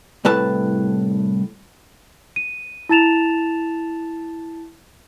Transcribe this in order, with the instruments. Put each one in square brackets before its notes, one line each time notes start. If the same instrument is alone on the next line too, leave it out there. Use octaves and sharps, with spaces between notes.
[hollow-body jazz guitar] C2 A2 B4 A5
[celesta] D#7
E4 A5 A6 E7 F7